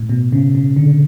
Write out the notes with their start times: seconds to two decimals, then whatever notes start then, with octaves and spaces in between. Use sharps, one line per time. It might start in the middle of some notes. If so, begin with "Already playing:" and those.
Already playing: A2
0.09 B2
0.32 C#3
0.55 C#3
0.76 D3